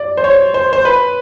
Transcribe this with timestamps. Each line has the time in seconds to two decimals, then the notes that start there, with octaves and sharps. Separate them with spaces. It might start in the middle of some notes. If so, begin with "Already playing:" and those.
Already playing: D5
0.17 C5
0.24 C#5
0.54 C5
0.73 C5
0.85 B4